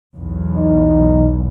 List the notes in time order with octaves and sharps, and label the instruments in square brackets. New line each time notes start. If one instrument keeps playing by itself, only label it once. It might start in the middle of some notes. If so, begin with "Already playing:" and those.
[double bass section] B1 E2
[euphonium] D#4